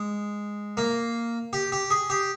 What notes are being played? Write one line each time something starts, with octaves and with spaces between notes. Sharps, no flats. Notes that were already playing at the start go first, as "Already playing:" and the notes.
Already playing: G#3
A#3
G4
G4
G#4
G4